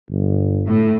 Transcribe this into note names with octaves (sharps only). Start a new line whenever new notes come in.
G1
A2